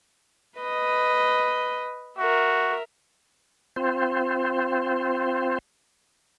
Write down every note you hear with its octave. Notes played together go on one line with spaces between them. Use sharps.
B4 D#5
F#4 A#4 E5
C4 F4 C5